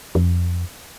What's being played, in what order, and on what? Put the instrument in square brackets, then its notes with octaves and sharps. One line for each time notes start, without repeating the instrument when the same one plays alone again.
[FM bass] F2